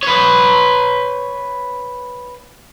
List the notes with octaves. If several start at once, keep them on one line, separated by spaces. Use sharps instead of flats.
B4 C#5